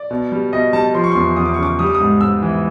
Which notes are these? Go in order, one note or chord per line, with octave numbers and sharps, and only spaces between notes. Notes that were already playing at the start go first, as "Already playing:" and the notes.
Already playing: D5
B2
G3
B2 D#5
G3 A5
F3 C6
C#6
E2 C6
E2 D#6
D6
C#6
C#3
D6
G3 D#6
D6
D#6
G#2
G#2 E6
E3